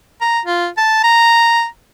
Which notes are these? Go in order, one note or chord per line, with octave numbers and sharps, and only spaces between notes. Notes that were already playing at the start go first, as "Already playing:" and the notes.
A#5
F4
A5
A#5